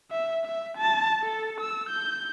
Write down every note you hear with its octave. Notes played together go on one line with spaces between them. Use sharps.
E5
E5
A5
A4
E6
G6